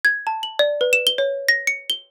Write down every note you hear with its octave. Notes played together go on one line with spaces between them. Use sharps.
G#6
A5
F#7
D5
B4
E7
G7
C#5
A#6
C#7
G7